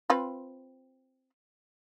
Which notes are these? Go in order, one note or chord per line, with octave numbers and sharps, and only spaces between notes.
C4 F4 B4